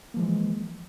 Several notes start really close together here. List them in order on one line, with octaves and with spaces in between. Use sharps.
A#3 F3 G#3 E3